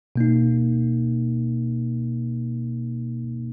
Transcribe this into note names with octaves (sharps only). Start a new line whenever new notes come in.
B2 A#3 D#4